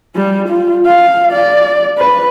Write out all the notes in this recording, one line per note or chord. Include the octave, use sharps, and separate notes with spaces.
G3
F4
F5
D5
B4